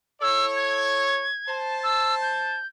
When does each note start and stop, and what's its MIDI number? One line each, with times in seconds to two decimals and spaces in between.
0.22 1.27 64
0.22 1.27 69
0.22 1.27 73
0.22 0.45 88
0.56 1.58 92
1.48 2.58 72
1.48 2.58 81
1.84 2.15 88
2.22 2.66 91